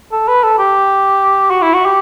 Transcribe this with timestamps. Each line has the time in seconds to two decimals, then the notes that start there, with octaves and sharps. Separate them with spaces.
0.12 A4
0.28 B4
0.43 A4
0.58 G4
1.51 F#4
1.62 E4
1.74 F#4
1.86 G4